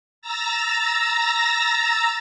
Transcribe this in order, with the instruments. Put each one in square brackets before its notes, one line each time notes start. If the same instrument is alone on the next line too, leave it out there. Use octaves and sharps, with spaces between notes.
[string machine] A#5 E6 A6 A#6